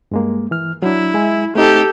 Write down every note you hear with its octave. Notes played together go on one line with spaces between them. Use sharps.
G2 G#3 A#3
E3 F6
F#3 D4 E4
G#3 E5 G#5
A3 C4 D#4 G4 A4